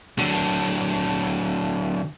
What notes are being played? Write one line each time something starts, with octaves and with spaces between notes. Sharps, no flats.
D3 F#3